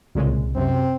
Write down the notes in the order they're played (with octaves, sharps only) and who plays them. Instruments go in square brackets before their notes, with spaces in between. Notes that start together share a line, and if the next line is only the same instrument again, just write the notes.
[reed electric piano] C2 [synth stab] A#2 C#3 G#3
[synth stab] F#2 C3 [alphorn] C4